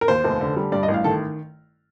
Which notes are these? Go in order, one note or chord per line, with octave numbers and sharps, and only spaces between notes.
A#4
D#2 C5
F1
D3
G3
G2 D5
D#5
A1
F5
D#3 A4